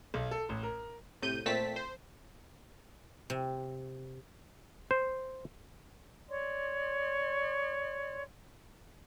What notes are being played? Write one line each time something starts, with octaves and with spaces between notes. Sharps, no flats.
B1
A4
A1
A#4
A2 C3 G6 D#7
A#2 A3 C4 A5 B6
C5
C3
C5
C#5 D5 C6